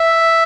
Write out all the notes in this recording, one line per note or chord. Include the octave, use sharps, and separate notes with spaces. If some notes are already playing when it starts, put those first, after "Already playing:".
Already playing: E5